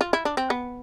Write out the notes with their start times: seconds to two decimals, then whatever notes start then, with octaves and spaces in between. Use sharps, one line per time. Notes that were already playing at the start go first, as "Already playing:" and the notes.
0.01 F4
0.13 E4
0.25 D4
0.37 C4
0.50 B3